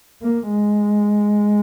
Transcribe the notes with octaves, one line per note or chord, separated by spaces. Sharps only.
A#3
G#3